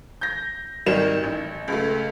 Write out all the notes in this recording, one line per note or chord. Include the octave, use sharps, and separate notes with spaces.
G6 A#6
G#1 D#3 G3 E7
A1
C#2 A3